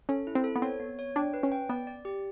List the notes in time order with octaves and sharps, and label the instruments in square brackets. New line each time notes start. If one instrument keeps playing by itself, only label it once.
[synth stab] C#4 [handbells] A4
[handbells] E4
[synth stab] C4
[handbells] A4
[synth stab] B3
[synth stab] C4 [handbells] C#5
[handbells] B3
C#5
[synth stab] D4 [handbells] G5
[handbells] B4
[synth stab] C#4
[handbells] G5
[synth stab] B3 [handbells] D5
[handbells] D5
G4